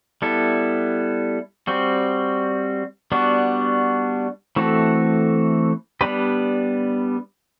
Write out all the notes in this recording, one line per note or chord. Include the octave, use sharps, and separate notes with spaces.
G3 B3 E4 A4
G3 C4 F#4
G3 B3 D4 F#4
E3 A3 C4 F#4 A4
G3 B3 D4 G4 B4